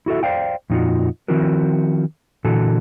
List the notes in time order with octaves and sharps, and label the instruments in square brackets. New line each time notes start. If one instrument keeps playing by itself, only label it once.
[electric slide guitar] E4 F#4 A4 E5
C5 D5 F5 G5
F2 A#2 D#4 F4 F#4
D#3 F3 C4 E4 F#4 A#4
A#2 D3 E3 F#4 A4